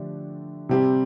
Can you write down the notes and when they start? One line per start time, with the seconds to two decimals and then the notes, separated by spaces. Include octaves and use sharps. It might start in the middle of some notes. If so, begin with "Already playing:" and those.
Already playing: D3 F3 A3 D4 G4
0.69 C3 G3 C4 G4